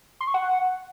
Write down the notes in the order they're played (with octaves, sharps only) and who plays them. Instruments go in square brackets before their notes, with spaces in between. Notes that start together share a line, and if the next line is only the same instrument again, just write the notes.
[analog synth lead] C6
C#6
F#5